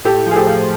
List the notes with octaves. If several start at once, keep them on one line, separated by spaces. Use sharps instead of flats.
A2 G4 A4
F3 G#4
G4 A4
F3